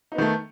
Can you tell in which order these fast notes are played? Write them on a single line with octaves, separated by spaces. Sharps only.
D#4 B3 D#3 A3